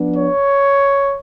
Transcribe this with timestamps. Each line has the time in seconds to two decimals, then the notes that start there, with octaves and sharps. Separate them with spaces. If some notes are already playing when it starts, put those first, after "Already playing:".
Already playing: F3 B3 D4
0.16 C#5